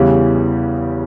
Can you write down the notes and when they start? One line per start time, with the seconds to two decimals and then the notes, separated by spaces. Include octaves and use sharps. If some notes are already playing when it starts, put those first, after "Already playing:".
Already playing: E2 C#3 E3 G3